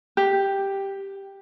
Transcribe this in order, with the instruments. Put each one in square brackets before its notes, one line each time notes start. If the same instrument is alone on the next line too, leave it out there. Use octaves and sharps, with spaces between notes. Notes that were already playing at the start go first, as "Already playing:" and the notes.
[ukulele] G4